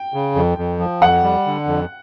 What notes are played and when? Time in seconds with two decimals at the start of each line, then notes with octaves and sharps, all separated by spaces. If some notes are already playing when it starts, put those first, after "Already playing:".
Already playing: G5
0.14 C#3
0.35 F2
0.58 F2
0.79 F3
1.02 F2 F#5
1.23 G3
1.46 D3
1.67 F2